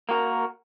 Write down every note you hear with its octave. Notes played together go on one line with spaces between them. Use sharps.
A#3 F#4 A#4